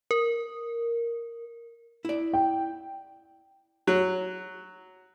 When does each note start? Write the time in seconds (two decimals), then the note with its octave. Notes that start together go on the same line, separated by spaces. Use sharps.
0.11 A#4
2.05 E4 D5
2.33 G5
3.87 F#3